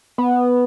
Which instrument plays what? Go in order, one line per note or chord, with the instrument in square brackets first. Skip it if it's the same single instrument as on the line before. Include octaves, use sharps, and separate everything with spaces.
[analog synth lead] B3